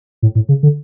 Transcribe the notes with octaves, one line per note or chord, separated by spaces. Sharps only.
A2
A2
C#3
D3